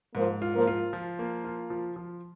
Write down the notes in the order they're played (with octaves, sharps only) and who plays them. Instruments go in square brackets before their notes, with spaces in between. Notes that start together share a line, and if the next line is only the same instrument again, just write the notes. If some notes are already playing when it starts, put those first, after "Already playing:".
[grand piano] G#2 [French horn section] F3 A#3
[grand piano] F4
[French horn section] F3 A#3
[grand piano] F4
F3
A#3
F4
F3
F3